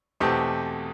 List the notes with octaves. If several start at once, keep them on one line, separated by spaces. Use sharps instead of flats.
E2 B2 A3 C4 G4